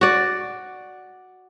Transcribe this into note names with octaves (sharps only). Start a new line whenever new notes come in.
F#4 D5